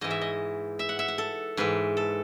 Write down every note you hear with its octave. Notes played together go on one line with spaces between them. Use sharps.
G#2 E3 D#5
E5
D#5
E5
F#5
E5
F#5
A4
G#2 E3 B4
A4